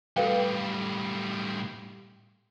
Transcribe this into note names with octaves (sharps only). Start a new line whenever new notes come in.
A2 G3 A4 B4 F5 G5